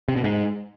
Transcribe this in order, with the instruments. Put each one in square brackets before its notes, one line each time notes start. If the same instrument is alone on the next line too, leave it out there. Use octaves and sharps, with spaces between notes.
[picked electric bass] C3
B2
G#2